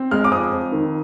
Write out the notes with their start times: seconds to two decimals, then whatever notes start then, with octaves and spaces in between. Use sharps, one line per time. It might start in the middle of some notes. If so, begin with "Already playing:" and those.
Already playing: C4
0.11 G#3 F6
0.24 D6
0.31 F2 D#6
0.52 F2
0.72 D#3